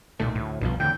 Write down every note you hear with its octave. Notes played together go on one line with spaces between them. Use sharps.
B1 A#2 D#3 A3
D2 A2
B1 G2 B2 F3
E2 A2 D3 G5